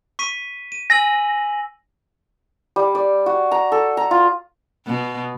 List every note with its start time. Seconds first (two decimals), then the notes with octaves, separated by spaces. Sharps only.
0.19 C#6 B6 D#7
0.72 D#7
0.90 G#5 E6 A#6 F#7
2.76 G3
2.95 D5
3.26 F#4
3.51 A#5
3.72 A4
3.97 A#5
4.11 F4
4.87 B2